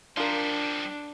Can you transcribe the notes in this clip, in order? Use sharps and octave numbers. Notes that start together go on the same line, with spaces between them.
F3 G3 D4 F4 A#4